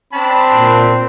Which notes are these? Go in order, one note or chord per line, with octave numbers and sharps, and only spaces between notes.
C4 D4 A5 B5
A#2